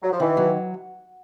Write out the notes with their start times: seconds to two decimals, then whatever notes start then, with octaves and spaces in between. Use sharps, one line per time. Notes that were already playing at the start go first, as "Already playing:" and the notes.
0.02 F#3
0.12 F3
0.20 D#3 E3
0.37 F#3